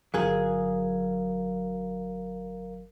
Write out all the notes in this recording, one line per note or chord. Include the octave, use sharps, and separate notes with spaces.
G1 F#3 G#4 A#4 F5